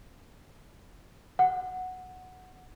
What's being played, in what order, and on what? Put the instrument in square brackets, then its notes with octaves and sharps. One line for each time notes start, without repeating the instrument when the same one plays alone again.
[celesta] F#5